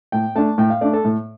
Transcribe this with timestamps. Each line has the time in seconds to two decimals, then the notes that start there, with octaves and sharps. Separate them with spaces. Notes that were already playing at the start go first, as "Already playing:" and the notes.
0.12 A2 G5
0.35 A3 D4 A5
0.58 A2 G5
0.70 F5
0.81 A3 D4 D5
0.93 A4
1.05 A2